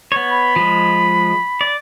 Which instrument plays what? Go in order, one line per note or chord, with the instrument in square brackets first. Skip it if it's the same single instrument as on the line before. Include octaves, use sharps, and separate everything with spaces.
[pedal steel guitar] B3 C#5
[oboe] B5
[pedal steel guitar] F3 G#3
D5